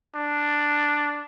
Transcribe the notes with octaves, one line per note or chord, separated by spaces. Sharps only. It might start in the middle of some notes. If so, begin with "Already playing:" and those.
D4